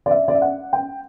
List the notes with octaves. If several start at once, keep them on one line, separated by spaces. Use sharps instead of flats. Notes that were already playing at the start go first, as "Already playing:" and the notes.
D5
E5
D5
E5
F#5
G5